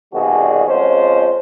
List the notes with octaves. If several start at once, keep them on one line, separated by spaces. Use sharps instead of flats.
A#1 B2 D#3 G3 F#4 G#4
F2 F3 G#3 C#4 C5